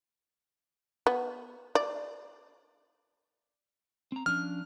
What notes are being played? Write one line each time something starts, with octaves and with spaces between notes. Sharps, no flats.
B3
D5
C4 A#5
F3 C#4 D4 F6